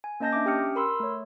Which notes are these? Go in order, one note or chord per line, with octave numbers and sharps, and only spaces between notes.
G#5
A#3 C#4 D#5 A5 G6 A#6
D4 E5 D6
C#4 G4 G5 D#6 F6 C#7
A#4 B5 C6 E6
A3 C#5